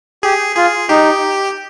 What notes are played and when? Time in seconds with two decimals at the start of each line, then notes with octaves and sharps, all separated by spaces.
0.23 G4 G#4
0.56 F4 G#4
0.89 D#4 G4